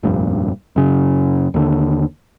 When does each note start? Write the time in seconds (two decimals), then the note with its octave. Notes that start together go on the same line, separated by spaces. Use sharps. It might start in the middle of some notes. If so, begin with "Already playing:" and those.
0.03 F1 A#1 G2
0.76 F#2 C#3
1.54 D#2 D3